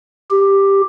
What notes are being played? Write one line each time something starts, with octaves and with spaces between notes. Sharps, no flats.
G4